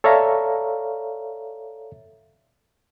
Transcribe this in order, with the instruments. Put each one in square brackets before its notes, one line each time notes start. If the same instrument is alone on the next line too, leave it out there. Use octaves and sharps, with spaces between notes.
[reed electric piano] A4 C#5 D5 E5 F5 A#5